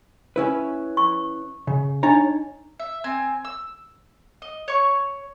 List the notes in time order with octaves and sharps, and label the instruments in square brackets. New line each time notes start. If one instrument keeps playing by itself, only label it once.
[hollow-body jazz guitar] C#4 E4 B4
[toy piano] C#6
[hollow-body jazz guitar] C#3
[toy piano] D4 D#4 D#5 [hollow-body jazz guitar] C#5 A#5
[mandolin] E5
C4 G#5
E6
D#5
C#5 C#6